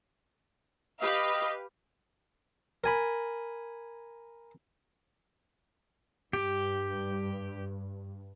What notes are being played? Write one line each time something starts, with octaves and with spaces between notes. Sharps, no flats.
G4 B4 D#5 F5
A#4 G#5 B5
G2 G4